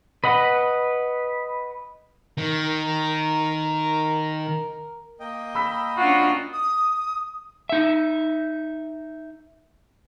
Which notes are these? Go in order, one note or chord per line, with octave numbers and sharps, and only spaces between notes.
B4 D#5 F#5
D#3 A#4
A#3 D#5 G5
B5 E6 B6
C#4 D4 F4 F#4
D#6
D#4 E5